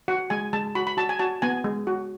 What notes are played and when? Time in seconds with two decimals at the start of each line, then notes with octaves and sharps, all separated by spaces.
0.08 F#4 F#5
0.30 G#3 G#5
0.53 G#3 A5
0.75 F#4 B5
0.87 B5
0.97 F#4 A5
1.09 G#5
1.19 F#4 A5
1.42 B3 G#5
1.64 G#3
1.87 F#4